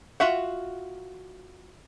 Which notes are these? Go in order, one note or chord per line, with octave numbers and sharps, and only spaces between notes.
F4 F#4 E5 F#5